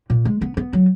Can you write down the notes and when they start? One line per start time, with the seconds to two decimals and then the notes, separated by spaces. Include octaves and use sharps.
0.10 A#2
0.25 G#3
0.41 B3
0.57 B3
0.73 F#3